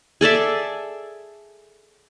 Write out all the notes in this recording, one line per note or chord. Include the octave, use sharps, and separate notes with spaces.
G#4 A4 D5 E5